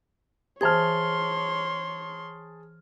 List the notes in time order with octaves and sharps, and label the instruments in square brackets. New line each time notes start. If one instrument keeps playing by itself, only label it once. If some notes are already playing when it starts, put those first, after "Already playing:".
[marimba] E3 C5 G#6 [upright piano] G#4 A5 F6 [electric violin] C#5 C6